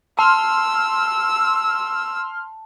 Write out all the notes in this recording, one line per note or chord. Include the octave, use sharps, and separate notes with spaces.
A5 C6 E6 F6